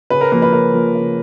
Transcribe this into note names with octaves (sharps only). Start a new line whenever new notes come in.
C#3 B4
A#4
F3 A#3 A#4
B4
C#3 A#4
F3 A#3
C#3